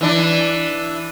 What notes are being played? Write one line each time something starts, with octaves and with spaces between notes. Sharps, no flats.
E3 D4